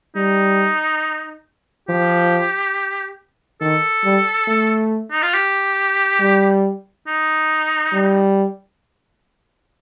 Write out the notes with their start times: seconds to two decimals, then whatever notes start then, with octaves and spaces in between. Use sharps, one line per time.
0.15 G3 D#4
1.89 F3 G4
3.61 D#3 A4
4.04 G3
4.48 A3
5.11 D#4
5.22 F4
5.34 G4
6.20 G3
7.07 D#4
7.93 G3